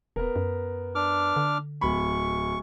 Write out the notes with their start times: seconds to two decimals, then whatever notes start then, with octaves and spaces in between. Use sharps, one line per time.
0.16 E1 B3 A#4
0.36 F#2
0.95 D4 D6 F6
1.36 D3
1.81 D1 B5 C#6